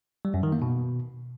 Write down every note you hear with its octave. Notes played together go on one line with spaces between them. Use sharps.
G3
F#2
D#3
A#3
B2